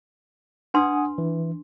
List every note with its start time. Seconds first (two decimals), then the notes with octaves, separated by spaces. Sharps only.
0.74 D4 B4 F#5 G#5 C6 D#6
1.18 E3